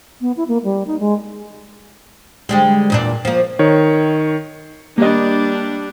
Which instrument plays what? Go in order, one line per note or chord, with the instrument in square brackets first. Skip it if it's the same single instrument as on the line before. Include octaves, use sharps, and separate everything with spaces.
[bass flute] B3
E4
A#3
G3
D#4
G#3
[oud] D3 G3 G#3
E2 A#2 D4
F3 A#3
[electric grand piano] D#3 C#5
[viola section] G3 D4 [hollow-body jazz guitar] A#3 D#5